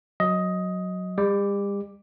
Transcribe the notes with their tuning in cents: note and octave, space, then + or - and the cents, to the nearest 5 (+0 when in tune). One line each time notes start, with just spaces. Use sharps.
F#3 -10 D#5 +10
G3 +40 D6 +0